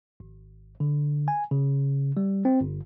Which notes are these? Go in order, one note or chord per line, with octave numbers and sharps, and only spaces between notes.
G#1
D3
G#5
C#3
G3
C4
G1